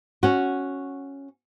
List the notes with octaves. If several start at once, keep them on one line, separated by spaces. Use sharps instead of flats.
C#4 F#4